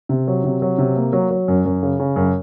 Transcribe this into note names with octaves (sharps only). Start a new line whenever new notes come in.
C3
F#3
C3
F#3
C3
A#3
F#3
F#3
F#2
F#2
C#3
C#3
F#2